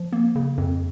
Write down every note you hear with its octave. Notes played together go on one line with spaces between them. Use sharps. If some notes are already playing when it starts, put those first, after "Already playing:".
Already playing: F3
A#3
C#3
F2